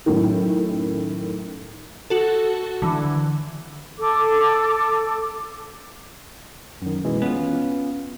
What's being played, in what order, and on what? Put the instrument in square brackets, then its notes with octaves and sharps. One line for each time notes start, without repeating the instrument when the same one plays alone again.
[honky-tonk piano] F#2 A2 D#3
[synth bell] F#4 A4
D3 E3
[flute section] A4 D6
[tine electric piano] F#2 D#3
B2 E3 G#3
[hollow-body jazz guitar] B3 F4 [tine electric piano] C#4